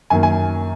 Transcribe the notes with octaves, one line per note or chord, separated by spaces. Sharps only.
F#2 D#3 A#3 G#5
G#5